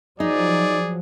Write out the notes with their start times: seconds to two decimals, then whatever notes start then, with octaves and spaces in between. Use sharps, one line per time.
0.20 F3 F#3 D#4 G#4 D5